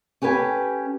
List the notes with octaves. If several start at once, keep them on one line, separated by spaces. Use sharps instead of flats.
C#4 G4 A4 B4 G#5